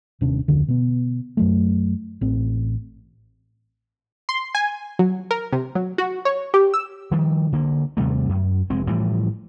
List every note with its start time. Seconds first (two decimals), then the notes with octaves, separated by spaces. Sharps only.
0.21 D#1 C3 C#4 D4
0.48 F1 D2 D3
0.68 B2 B3
1.37 F#2 F#3 A3
2.21 A1 C4
4.29 C6
4.55 G#5
4.99 F#3
5.31 A#4
5.53 C3
5.75 F#3
5.98 F#4
6.25 C#5
6.54 G4
6.74 E6
7.11 D#3 F3 G3
7.52 D3 A#3
7.97 D#2 C3 G3 A3
8.29 F#2
8.70 F1 G#3 C4
8.87 A2 E3 F3 G3